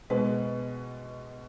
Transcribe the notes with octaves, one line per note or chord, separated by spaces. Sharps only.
B2 G#3 B4